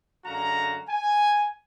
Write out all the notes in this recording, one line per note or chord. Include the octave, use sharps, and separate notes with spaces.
F#2 D3 G#3 F#4 F5 A#5
G#5